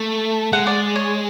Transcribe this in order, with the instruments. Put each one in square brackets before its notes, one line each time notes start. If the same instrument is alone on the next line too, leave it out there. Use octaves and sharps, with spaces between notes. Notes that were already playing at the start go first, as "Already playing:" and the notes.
Already playing: [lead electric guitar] A3
[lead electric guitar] G#3 [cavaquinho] F#5
[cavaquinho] D5
C#5